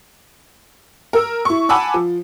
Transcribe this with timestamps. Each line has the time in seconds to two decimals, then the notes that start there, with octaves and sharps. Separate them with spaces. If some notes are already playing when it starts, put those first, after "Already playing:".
1.13 A#4 E6
1.45 E4 C#6
1.69 F#5 G#5 A5 B5 D6 E6
1.94 F3